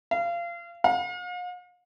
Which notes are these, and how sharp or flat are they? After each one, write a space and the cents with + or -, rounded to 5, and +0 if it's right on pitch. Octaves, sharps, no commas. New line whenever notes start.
F5 -25
F5 +45